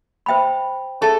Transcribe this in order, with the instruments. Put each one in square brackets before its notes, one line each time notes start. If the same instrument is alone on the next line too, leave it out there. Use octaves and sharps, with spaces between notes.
[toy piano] C5 E5 G5 B5
[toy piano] G#4 C#5 E5 A5 [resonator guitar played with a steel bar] A4